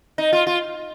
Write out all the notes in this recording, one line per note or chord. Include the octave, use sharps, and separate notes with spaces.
D#4
F4
F4